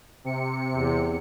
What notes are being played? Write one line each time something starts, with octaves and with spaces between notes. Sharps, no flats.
C3 C#7
E2